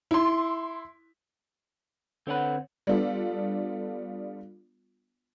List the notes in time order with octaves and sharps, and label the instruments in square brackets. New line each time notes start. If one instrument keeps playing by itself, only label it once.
[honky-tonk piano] E4 C6
[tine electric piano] D3 B4 [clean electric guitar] C4 C#5 F#5
[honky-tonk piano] G3 B3 D4 F4 A4